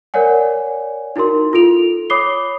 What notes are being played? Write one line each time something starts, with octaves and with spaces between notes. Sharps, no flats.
A#4 C#5 D5 F#5 G#5
D#4 E4 F#4 A#4 C6
F4 A4 D7 F7
C#5 B5 D6 D#6 C7 G7